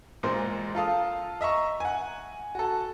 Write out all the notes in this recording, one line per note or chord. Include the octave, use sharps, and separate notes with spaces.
E1 A#2 G#3 A#4 C5 C6
F4 A4 F5 D#6
D#5 E5 A#5 C#6
F#5 G#5
F#4 A4